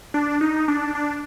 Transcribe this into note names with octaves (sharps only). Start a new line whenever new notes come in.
D4
D#4
D4
D4